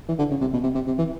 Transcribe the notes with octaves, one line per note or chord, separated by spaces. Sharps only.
E3
D3
C#3
C3
B2
C3
C3
C3
E3